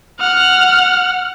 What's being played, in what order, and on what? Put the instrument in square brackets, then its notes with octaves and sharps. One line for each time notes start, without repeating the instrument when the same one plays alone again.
[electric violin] F#5 F6